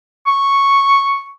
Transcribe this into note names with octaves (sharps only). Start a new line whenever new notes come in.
C#6